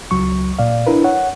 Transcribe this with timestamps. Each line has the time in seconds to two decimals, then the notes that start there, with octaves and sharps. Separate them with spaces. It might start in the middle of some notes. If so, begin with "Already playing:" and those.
0.11 C#2 F#3 C#6
0.59 A#2 D5 F5
0.87 D4 E4 A#4 B4
1.04 C#5 F#5